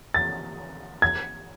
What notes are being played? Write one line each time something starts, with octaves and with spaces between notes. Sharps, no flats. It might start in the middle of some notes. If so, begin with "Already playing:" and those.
A6
G#6